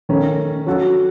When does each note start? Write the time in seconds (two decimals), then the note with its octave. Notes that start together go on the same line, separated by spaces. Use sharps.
0.09 D#3 A3 C#4
0.67 F#3 C#4 F#4 A4